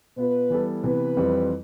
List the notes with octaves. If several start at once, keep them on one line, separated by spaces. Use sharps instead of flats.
B2 B3 F4 B4
E3 G3 B3 E4 A4
C3 E3 B3 B4
F2 E3 G3 C4 F4